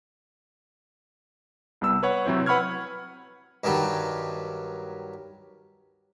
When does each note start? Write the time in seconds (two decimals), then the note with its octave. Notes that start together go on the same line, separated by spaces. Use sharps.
1.81 C2 G3 B3 E6
2.03 B4 C#5 F#5
2.25 C3 F#3 C4 E4 C5
2.46 B4 F#5 B5 C#6 F6 G#6
3.64 G2 D#3 F#3 G3